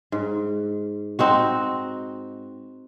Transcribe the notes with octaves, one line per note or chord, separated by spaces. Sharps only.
G#2
C4 D#4 F#4